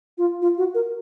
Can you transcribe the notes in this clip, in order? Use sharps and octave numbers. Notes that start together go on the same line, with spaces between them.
F4
F4
F#4
A#4